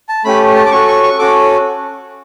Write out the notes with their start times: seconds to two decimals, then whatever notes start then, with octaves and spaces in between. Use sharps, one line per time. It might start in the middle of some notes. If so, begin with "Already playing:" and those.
0.09 A5
0.25 A3 C#4 G4 B5
0.56 A5
0.66 D6
0.71 C#4 F#4 A4 C#6
0.88 C#6
1.03 C#6
1.19 C#4 F#4 A4 D6